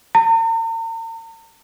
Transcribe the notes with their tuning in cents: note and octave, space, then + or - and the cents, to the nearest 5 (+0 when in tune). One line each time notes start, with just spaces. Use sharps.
A#5 -45